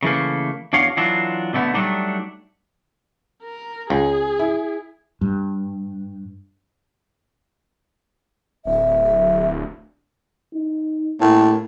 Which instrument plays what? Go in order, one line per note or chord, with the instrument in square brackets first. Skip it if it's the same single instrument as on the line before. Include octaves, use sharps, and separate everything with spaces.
[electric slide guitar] C#3 E3 A3 A#3
E2 D4 F#4 C#5 F5
E3 F#3 D4 F4
B2 D3 A3 B3
F#3 G3 A3 D4 D#4
[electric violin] A#4
[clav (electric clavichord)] C#2 [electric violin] G#4
[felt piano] E4
[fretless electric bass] G2
[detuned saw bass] D1 [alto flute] E5
[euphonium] D#4
[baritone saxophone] A2 [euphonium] A#3